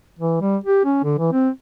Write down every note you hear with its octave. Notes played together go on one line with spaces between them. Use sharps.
E3
G3
G4
C#4
D3
E3
C4